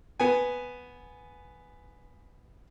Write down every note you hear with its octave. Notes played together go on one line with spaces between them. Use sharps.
B3 G#5